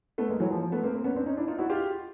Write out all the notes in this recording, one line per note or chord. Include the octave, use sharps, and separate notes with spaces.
A3 B3
G#3 A#3
E3 F#3
F3
F3
A3 B3
A#3 C4
A#3 C4
B3 C#4
C4 D4
C#4 D#4
D4 E4
D#4 F4
E4 F#4
F4 G4